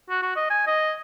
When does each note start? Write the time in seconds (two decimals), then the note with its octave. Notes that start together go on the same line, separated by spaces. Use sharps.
0.10 F#4
0.23 F#4
0.36 D#5
0.50 G#5
0.67 D#5